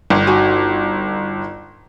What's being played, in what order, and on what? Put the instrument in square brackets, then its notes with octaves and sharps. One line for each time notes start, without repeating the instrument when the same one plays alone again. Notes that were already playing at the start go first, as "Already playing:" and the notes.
[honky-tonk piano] G1
[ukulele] D#4 F#4 G#5